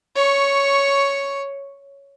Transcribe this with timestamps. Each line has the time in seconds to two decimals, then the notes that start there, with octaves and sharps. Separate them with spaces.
0.16 C#5 C#6